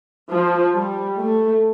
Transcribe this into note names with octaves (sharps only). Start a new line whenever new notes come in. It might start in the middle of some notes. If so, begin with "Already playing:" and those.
F3
G3
A3